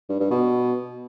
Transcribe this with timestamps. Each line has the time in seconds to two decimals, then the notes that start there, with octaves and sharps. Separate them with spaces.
0.09 G2
0.20 G2
0.31 B2